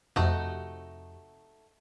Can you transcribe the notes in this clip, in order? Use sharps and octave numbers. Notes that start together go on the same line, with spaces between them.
F2 C3 A3 D#4 F#4